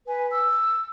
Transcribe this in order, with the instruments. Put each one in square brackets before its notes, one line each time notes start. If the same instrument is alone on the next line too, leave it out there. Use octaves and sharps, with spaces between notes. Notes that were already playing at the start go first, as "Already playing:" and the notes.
[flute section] B4 G#5
E6